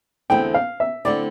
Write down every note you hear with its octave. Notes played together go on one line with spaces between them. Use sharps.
E2 D3 A3 C4 E4 G5
F5
E5
D3 A3 C4 E4 D5